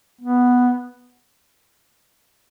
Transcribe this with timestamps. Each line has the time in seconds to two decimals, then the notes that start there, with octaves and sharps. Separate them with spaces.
0.21 B3